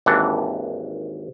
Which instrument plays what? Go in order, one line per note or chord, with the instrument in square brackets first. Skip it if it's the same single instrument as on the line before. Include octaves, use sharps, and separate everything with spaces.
[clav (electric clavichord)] G#1 D#2 E3 D4 F#5